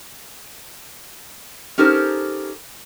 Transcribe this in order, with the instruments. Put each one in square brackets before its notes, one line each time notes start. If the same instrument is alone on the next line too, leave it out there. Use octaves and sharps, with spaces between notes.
[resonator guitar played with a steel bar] C#4 D#4 G4 A4 A#4 C5